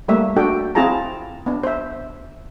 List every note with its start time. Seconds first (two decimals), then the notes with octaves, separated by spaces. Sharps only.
0.08 G3 A3 A#3 E5
0.36 D4 F#4 A4 G5
0.75 C4 E4 F4 G#4 A5 A#5
1.46 B3 D4
1.64 C5 E5